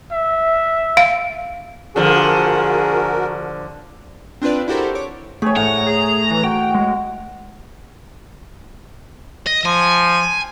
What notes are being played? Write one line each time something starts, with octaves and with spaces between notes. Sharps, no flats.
E5
F5
D3 F3 F#4 G#4 A#4
C4 D4 F4 B4 D5
E4 F#4 G4 A4 A#4 C5
C#5 D6
A3 G#4 C#5
A2 F#5 A#5
G#4
E3
F#4 G5
G#3
D#5
F3 G#5